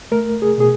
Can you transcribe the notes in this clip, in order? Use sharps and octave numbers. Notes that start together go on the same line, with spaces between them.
A3 A#4
G#4
B2 G#4